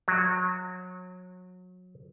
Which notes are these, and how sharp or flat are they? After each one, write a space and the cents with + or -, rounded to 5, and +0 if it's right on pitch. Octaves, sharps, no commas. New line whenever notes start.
F#3 -25